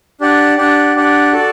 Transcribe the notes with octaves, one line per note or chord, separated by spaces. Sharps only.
D4 G4 D5 F#5
D4 G4 D5 F#5
D4 G4 D5 F#5
F#4 A4 D5 A5